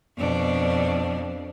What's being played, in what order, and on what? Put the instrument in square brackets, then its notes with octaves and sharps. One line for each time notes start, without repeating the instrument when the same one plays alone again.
[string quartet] F2 B2 D4